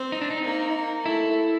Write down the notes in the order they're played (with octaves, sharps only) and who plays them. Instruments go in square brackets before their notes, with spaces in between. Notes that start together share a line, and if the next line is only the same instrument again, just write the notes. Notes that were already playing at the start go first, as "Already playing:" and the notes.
Already playing: [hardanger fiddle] C4
[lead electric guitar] D#4
D4
D#4
[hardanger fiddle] A#3
[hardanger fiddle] A3 [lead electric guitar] E4